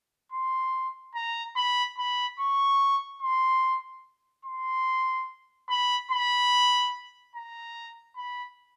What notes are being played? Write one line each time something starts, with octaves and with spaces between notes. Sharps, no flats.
C6
A#5
B5
B5
C#6
C6
C6
B5
B5
A#5
B5